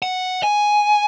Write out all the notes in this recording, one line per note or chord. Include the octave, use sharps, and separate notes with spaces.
F#5
G#5